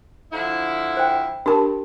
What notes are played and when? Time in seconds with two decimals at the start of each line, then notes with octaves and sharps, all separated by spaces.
0.32 D3 F3 E4
0.97 C5 G5
1.46 D4 G4 A#4 A5